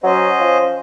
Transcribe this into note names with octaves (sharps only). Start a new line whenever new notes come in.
F#3 C#4 C5 D#5
F3